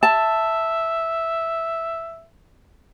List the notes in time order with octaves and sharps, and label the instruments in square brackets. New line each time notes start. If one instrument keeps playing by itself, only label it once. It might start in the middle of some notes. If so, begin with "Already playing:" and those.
[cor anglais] E5 [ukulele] A5